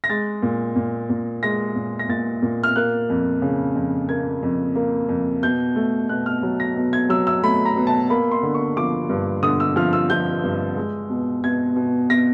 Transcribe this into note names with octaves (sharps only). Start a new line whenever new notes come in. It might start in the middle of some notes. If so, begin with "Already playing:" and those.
A#6
G#3 A6
A#2
A#2
A#2
G#3 A#6
A#2
A#6
A#2 A6
A#2
F6
A#3 F#6
F2
C#3
F2
A#3 G#6
F2
A#3
F2
B2 G6
A3
B2 F#6
F6
F#3
A#6
B2
G#6
F#3 E6
E6
A3 B5
A#5
B2
A5
A#3 B5
C6
D3
C#6
F3 D6
G2
D3 D#6
E6
F3 F6
E6
F3 G6
G2
G#3
B2
B2 G#6
B2
B2 A#6